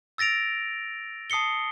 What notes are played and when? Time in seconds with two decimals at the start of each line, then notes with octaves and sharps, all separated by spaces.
0.18 E6 A6 A#6 D7 F7
1.30 A5 D#6 C7 C#7 G7